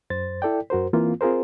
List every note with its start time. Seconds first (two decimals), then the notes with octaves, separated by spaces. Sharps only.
0.10 F#2 C5 A6
0.42 E4 A4 D5 G5
0.70 F#2 F#4 A#4 C5
0.93 E3 A#3 C4 F4
1.21 C4 F4 G#4 A#4 C5